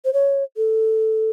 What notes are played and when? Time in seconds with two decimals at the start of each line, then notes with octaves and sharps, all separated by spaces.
0.05 C5
0.13 C#5
0.57 A4